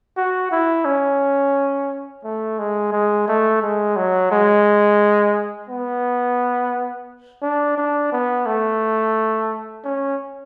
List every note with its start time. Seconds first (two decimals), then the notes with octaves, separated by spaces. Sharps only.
0.17 F#4
0.51 E4
0.85 C#4
2.24 A3
2.59 G#3
2.92 G#3
3.28 A3
3.63 G#3
3.96 F#3
4.31 G#3
5.69 B3
7.42 D4
7.78 D4
8.12 B3
8.46 A3
9.84 C#4